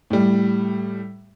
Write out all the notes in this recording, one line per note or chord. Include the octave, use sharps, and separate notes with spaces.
A2 G3